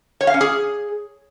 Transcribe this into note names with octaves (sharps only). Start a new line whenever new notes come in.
C#5
F5
C#4
G#4